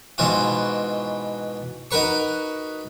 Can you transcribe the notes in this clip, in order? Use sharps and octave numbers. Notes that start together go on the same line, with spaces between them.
G#2 B2 E3 F4 F#4
D#4 F#4 A#4 B4 C#6